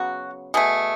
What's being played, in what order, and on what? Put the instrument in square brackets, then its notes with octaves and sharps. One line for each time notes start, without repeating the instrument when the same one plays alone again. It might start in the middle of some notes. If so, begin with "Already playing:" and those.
Already playing: [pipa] C#3 F#3 B3 F#4
B2 A3 G#4